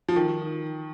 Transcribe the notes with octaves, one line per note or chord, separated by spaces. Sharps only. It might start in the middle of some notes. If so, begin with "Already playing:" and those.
F3
D#3